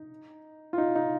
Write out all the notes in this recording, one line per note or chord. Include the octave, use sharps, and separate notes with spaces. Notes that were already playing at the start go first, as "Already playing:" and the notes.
Already playing: D#4
F4
D#4
D#4